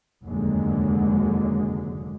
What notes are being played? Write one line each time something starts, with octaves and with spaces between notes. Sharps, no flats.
F1 D#2 G#2 D3 F#3 G#3